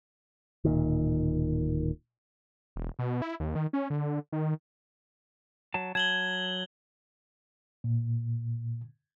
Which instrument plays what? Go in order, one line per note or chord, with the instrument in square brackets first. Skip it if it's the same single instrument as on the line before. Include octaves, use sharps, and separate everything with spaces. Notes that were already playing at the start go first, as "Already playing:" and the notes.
[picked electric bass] D1 A#2 D#3
[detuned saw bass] E1
B2
E4
D#2
D#3
C#4
D3
D#3
[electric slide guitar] F#3 A5
[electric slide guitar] F#3 A5 [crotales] G#6 F#7 G7
[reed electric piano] A#2